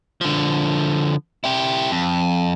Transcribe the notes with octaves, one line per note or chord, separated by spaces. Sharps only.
D3 F3
E4 G4
F2